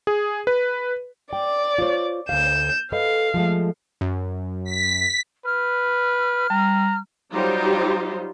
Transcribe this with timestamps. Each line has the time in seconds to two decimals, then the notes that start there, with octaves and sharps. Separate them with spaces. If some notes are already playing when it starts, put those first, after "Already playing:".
0.07 G#4
0.47 B4
1.33 D5 G5
1.78 F4 C5 C#5
2.29 D2 F5 G6 E7
2.92 A4 B4 D#5 F5
3.34 F3 G#3 A3
4.01 F#2
4.64 B6
5.45 B4 F6
6.50 G3 A#5
7.33 F#3 G3 D#4 F4 G4 C5